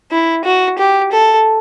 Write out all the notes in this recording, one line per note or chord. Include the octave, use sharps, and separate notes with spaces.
E4
F#4
G4
A4